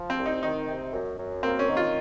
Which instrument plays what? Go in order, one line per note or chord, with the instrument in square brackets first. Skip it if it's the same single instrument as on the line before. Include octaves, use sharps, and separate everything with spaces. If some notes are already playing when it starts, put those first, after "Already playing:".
Already playing: [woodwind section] F3
[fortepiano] C4
[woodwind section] C2
[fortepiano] D#4
[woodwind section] D#3 [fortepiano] D#4
[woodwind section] C3
F#2
F#2
[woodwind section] A#3 [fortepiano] C4
[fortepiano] C#4
[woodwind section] D#3
[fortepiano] F4